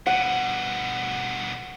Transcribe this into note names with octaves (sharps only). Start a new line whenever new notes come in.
G2 B2 F#5